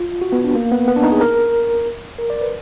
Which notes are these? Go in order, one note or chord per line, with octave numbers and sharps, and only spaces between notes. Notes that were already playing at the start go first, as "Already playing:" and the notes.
Already playing: F4
F#4
B3
D4
A#3
B3
B3
D4
D#4
G#4
A#4
A#4
D5
B4